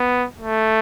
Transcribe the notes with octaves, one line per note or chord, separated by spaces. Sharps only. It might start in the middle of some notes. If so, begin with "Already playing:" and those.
Already playing: B3
A3